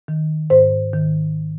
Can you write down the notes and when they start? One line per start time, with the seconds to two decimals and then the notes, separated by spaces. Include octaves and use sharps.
0.08 D#3
0.50 G#2 C5
0.93 D#3